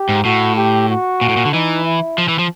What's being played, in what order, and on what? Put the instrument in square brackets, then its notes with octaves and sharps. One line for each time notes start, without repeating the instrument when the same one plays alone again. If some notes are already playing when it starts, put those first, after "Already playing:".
Already playing: [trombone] G4
[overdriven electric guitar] G#2
[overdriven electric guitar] A2 [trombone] F#4
[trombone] G4
F#4
[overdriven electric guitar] A#2
A2
A#2
D3
[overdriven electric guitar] E3 [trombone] D#4
[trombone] E4
[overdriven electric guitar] F3
E3
F3